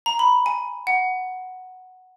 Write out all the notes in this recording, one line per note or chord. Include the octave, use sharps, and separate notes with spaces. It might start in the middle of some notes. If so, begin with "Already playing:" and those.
A#5
B5
G#5
F#5